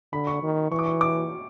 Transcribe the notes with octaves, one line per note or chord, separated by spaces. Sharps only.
D3 B5
C#6
D#3
E3 C#6
D6
C#6
D6